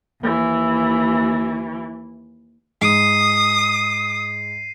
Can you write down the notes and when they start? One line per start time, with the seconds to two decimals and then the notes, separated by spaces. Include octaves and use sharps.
0.20 D#2 E3
2.82 G#2 D#6 C7 D#7